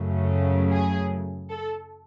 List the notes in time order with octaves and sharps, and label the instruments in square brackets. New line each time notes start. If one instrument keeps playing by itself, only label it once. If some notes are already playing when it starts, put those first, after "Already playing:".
Already playing: [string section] F#2 C#3 F#3 A3
G#4
A4